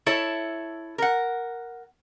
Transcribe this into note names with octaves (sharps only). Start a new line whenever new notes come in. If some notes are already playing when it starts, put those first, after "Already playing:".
E4 A4 C#5 E5
A#4 F#5